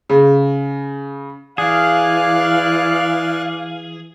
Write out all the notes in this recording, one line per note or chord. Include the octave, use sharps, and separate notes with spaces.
C#3
E3 G#4 D5 F5 F#6